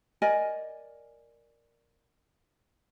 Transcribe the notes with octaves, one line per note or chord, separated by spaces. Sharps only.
A#4 D5 D#5 G#5